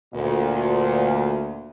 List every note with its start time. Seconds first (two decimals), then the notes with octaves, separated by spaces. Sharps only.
0.13 D2 A#2